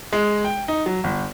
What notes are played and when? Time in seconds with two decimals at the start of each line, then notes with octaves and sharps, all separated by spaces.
0.13 G#3
0.44 G5
0.68 D#4
0.86 F#3
1.04 G1